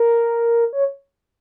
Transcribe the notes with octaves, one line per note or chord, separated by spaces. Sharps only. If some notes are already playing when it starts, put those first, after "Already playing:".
Already playing: A#4
C#5